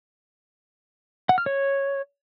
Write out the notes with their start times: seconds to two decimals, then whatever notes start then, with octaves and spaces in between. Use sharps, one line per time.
1.29 F#5
1.38 F6
1.46 C#5